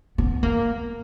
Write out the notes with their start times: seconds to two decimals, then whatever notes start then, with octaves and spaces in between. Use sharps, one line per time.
0.18 B3
0.43 A#3